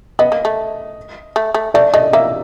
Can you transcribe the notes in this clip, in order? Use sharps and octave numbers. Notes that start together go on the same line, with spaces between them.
B3 D#5
A#3
A3
A3
A3
A3 D5
A3 D#5
A#3 E5